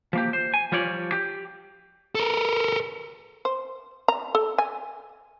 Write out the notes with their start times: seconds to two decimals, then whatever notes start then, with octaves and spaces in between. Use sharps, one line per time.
0.13 F3 A#3 G4
0.33 C5
0.54 G#5
0.72 F3 G3 F4 C#5 D5
1.12 G4
2.15 A4 A#4
3.45 C5
4.08 A#5
4.35 A4
4.58 G#5